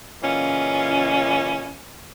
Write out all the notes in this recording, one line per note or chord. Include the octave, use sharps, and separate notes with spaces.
A#2 C#3 E3 C#4 F4 D#5